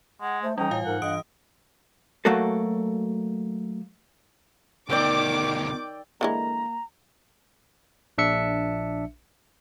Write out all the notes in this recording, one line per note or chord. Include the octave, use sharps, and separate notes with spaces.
G#3 F#5
A3 C5
E3 G3 C#4 D#4 G5
A2 F4 F5 G#5
G#2 A#4 F#5
G2 E3 D#5 D#6 D7
F#3 A3 A#3 F#4 A4
D2 B2 D#3 D5 G5 D6 E6
D3 E3 G#3 A#3 A#5
A#1 D4 E5 C#7